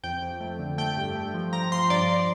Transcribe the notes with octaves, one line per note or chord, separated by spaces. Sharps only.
F2 G5
F2
A3
D3
A3 G5
G2
A3
F3
F3 A#5
F3 C6
G2 D5
D5